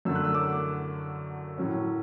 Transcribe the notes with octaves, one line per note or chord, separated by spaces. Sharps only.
F#2 D3 F#3 A3 E6
F#6
E6
D6
A2 F#3 C#4